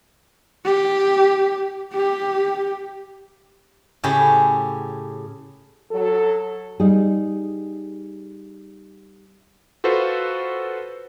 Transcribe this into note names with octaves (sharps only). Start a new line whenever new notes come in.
G4
G4
A2 C#3 G4 G#4 B5
F#3 A4
G3 D#4 G#4
F4 F#4 A4 B4 C5